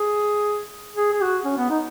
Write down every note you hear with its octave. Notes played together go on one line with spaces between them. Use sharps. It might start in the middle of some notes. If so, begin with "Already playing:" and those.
Already playing: G#4
G#4
G#4
F#4
C#4
B3
D#4